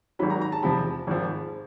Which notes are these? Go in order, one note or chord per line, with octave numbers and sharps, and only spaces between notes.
G#1 G#2 D#3 F#3 B5
A#5
A#5
A5
E2 C3 F3 B5
G#1 G#2 F3